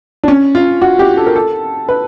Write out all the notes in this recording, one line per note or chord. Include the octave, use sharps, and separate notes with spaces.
D4
C#4
F4
F#4
G4
A4
A#4
A4
B4